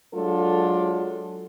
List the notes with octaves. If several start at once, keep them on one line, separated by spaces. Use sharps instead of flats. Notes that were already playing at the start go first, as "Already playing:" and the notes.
F#3 G#3 D4 F4 A4